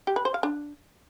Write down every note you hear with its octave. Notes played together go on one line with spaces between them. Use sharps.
G4
B4
C5
F5
D4